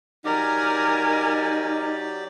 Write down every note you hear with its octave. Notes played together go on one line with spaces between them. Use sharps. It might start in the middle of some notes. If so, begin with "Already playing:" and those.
F#3 D#4 G4 A#4 D5 G#5